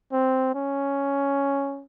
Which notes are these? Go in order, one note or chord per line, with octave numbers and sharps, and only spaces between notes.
C4
C#4